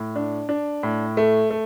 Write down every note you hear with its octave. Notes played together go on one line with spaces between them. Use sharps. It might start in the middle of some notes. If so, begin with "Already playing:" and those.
Already playing: A2
D4
D4
A2
A3
A3